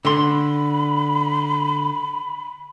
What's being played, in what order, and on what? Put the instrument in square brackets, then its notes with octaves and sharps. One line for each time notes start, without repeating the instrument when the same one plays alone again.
[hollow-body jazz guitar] D3 C6 [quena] B5